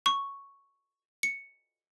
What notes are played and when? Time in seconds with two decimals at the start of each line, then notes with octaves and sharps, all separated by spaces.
0.06 C#6
1.23 C#7